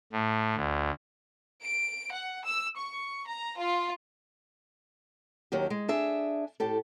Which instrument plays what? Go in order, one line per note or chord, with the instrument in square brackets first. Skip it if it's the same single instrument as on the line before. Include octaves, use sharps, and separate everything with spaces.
[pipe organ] A2
D2
[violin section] D7
F#5
E6
C#6
A#5
F4
[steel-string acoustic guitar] D#2 D#3 F#3 G4
G#3
D4 G#4 E5
A2 G4 A4